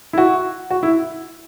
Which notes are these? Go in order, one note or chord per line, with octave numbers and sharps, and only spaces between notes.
E4
F#4
F#4
E4